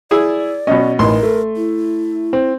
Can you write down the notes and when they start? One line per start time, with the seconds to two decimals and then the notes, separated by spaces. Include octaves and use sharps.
0.11 E4 G#4 D5
0.67 B2 C#4 D#5
0.99 A1 D#4 A#4 C6
1.23 A3
1.56 E4
2.33 C4